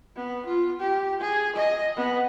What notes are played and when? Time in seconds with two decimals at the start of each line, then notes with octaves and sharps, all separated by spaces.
0.16 B3
0.46 F4
0.80 G4
1.20 G#4
1.56 D#5
1.97 B3